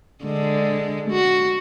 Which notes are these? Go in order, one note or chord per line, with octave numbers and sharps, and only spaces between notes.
D3 G#3
F#4